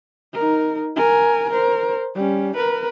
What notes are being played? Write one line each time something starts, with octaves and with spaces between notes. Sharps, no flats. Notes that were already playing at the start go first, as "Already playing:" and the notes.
D#4 A#4
A#4 G#5
A#4 C5
G3 C#4
A#4 B4